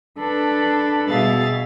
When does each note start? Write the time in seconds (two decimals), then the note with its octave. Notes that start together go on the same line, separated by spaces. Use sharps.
0.17 D4 A4 B4
1.09 B2 G3 G#4 E5 F5 A6